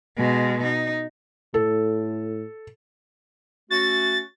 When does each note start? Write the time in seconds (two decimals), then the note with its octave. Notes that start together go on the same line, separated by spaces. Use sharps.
0.17 B2 G#3
0.63 D#4
1.54 A2 A4
3.70 A3 C#4 F#4 A6